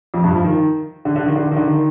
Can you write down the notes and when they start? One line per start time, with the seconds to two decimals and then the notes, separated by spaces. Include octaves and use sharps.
0.14 F2
0.24 G2
0.34 F3
0.44 D#3
1.05 D3
1.16 D3
1.26 D#3
1.36 D3
1.51 D#3
1.56 D3
1.68 D#3